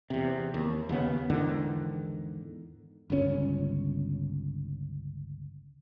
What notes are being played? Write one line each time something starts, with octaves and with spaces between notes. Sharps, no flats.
E2 C3
D#2
D#2 C#3 B3
E2 G#2 D3 D#3
G1 C#2 A#2 C#4